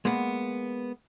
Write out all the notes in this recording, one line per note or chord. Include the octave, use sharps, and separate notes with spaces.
G#3 A#3 B3